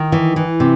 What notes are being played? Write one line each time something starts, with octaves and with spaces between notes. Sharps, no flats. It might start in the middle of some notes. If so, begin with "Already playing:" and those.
Already playing: D#3
E3
E3
C3